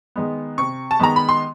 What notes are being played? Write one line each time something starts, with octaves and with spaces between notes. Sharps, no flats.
D#3 G#3 B3
C3 C#6
A5
D#3 G#3 B3 A#5
B5
C6